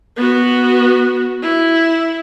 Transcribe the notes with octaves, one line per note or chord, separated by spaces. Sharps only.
B3 F#4
E4